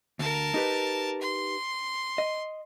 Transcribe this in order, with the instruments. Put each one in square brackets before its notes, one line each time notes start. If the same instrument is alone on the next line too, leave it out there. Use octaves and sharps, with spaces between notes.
[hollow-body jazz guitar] D2 [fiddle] A#4 A5
[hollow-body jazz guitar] D#4 G4 B4
[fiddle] C6
[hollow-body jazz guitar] D#5